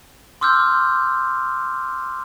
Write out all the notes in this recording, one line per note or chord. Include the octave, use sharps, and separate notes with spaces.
C6 D6 E6 F6 G6